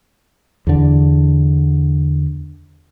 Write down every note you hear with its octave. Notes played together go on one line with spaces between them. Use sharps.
E2 D3